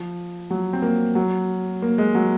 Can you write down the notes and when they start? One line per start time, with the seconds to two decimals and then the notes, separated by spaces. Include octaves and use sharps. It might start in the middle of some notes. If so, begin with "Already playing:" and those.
Already playing: F3
0.50 F#3
0.73 C4
0.82 A#3
1.15 F#3
1.82 A#3
1.98 G#3
2.15 F#3